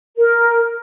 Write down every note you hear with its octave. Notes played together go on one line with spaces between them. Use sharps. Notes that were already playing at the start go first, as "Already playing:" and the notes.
A#4